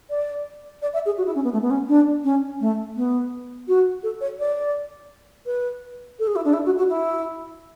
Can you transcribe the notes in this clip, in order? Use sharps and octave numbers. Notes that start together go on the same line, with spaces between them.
D5
D5
E5
G#4
F#4
E4
C#4
B3
A3
B3
C#4
D4
C#4
A3
B3
F#4
A4
C#5
D5
B4
A4
G#4
E4
D4
E4
F#4
F#4
E4